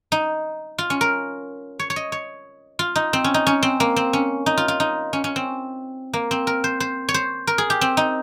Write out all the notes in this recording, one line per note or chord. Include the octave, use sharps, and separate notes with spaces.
D#4
F4
C#4
A#4
C#5
C#5
D#5
C#5
F4
D#4
C4
C#4
D#4
C#4
C4
A#3
C4
C#4
D#4
F4
F4
D#4
C#4
C#4
C4
A#3
C4
A#4
C5
C5
C#5
C5
A#4
G#4
G4
C4
D#4